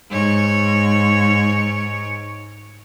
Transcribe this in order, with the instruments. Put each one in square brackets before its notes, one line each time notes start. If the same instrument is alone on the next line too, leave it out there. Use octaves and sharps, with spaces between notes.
[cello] G#2 C#5